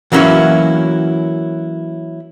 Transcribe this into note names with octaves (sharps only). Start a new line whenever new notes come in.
E3 F#3 A#3 C#4 E4 F#4